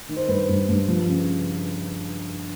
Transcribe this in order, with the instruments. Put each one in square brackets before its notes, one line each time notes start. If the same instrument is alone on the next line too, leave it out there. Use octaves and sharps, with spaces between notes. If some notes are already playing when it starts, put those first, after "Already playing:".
[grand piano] D#3
C5
G2 B4
G2
G2
F3
C#3